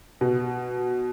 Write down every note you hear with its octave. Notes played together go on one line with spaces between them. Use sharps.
B2